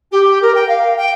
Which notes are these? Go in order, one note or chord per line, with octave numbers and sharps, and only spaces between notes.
G4
A#4
G5
F5
G5